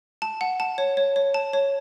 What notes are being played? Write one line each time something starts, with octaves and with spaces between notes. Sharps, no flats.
A5
F#5
A5
C#5
C#5
C#5
A5
C#5